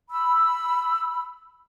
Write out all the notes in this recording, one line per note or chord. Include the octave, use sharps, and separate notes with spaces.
B5 E6